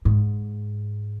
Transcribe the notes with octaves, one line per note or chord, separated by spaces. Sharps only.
G#2